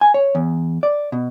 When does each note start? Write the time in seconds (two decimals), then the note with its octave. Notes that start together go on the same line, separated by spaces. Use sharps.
0.01 G#5
0.14 C#5
0.35 E2
0.83 D5
1.12 B2